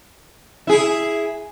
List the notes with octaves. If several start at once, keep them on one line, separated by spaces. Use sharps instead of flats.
E4 G#4